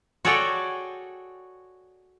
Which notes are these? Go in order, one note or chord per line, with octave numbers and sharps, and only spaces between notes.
F#4 G#4 A4 C#5 D5 G5